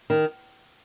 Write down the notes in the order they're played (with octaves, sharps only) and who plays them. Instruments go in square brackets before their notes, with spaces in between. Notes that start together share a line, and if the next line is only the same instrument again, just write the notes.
[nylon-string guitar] D#3